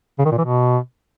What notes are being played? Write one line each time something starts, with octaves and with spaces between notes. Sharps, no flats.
C#3
D#3
A#2
E3
B2